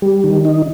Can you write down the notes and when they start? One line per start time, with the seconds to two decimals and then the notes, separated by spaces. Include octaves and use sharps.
0.02 G3
0.24 D#3
0.45 D#4